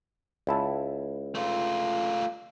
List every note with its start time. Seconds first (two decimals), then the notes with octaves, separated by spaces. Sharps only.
0.47 C#2 E4 A5
1.35 A3 F4